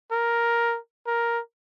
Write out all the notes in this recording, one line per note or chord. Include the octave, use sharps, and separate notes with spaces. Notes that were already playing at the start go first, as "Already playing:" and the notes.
A#4
A#4